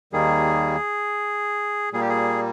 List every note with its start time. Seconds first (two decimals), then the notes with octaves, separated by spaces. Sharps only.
0.13 D#2 D#3 G3 A#3 G#4
1.93 A#2 G3 A#3 G#4
2.01 G4
2.09 G#4